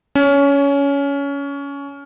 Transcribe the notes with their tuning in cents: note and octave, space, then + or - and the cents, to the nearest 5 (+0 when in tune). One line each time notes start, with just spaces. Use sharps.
C#4 +20